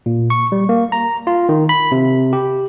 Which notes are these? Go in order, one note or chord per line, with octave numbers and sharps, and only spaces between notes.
A#2
C#6
G3
A#3
A#5
F4
D#3
B5
C3
G4